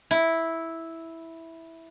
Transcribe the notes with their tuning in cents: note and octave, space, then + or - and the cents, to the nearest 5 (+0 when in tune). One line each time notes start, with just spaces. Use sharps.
E4 -5